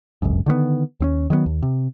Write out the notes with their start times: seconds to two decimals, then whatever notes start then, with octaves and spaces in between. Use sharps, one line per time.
0.22 D1 G1 C#2 F#2
0.46 D3 D#3 G3 B3
1.00 D#2 C4 C#4
1.30 D#3 F#3 G#3 B3
1.46 D#2
1.63 C3